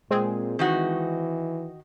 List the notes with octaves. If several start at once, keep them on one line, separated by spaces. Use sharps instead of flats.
A#2 G#3 C4 G#4
D#3 E3 D#4 F#4